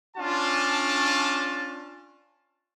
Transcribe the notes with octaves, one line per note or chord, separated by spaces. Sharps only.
C#4 D4 F4 A5